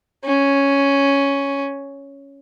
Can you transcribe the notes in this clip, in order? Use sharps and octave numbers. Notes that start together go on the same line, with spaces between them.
C#4